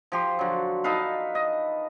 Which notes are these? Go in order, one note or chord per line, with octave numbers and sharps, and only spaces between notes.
F3 G4 C6
D3 F#3
D#4 A4 B4 F5
D#5